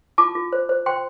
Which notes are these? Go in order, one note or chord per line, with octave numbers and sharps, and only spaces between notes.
F4 A5 D6
F4
C5
C5
C5 G5 C6